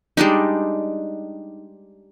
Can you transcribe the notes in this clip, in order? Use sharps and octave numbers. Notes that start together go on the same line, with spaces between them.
G3 G#3 D4 D#4